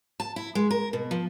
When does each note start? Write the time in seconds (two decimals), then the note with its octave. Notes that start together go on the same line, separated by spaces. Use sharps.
0.20 A5
0.36 E4
0.55 G#3
0.71 A#4
0.93 B2
1.11 F3